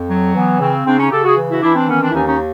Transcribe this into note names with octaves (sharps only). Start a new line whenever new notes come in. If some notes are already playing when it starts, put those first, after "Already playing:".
Already playing: F2
F#3
E3 B3
C#3 C4
C#3 C4 D4
C#4 D#4
C#3 G4 A4
F#4 G#4
E3
E4 F#4
E3 D4 E4
C4 D4
D#3 B3 C#4
C4 D4
E4
D#2 C#4 D#4
C#4 D#4